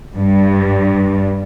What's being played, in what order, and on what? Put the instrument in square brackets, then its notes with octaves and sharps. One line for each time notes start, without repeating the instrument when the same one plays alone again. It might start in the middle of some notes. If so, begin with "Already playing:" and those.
[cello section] G2